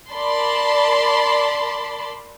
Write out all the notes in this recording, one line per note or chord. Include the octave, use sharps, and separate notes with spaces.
A#4 D5 A5 B5 C6